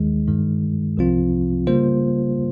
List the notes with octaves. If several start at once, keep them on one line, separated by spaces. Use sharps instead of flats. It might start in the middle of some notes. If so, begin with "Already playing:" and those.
Already playing: D#2 D#3 G#3
G2 D#3 G#3
C2 C3 F3 C4 F4
C#3 G3 A#3 F4 C5